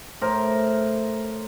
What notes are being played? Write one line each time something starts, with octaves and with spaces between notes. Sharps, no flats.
A2 A#4 C5